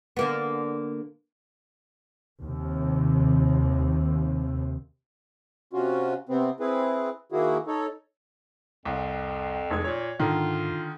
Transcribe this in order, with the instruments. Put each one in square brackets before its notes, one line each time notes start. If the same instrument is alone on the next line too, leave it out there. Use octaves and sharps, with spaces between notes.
[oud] D3 A#3 B3
[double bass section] D#2 C3
[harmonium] C3 C#4 F4 F#4
C3 B3 C4
C4 E4 G#4 B4
D#3 A#3 E4 F#4 G#4
D#4 A4 C#5
[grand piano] C2 [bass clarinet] F2
[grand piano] F1 G#3 G#6
[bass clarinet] A#2 [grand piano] C#5
[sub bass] G#2 [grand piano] D3 D#3 [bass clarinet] F4